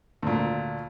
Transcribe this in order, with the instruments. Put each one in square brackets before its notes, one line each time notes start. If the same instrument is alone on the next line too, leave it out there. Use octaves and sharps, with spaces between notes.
[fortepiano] D2 A#2